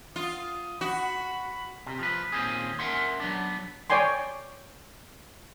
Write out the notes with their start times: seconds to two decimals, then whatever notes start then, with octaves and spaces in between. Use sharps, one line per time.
0.16 F4 D#6
0.81 F#4 B5
1.86 C3
1.99 F3 B4
2.32 D#2 A#2 C4 C#4 G#4
2.79 C#4 A#4 E5 F#5 C6
3.20 F#3 B3 D4
3.90 C#5 D5 G5 G#5 C6